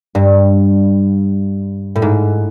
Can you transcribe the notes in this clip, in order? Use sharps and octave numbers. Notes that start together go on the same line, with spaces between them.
G2
A2
G#2